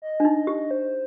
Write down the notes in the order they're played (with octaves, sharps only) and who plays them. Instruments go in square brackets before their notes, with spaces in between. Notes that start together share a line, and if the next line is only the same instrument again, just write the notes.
[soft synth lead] D#5
[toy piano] D4
D#4
G4
[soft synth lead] C5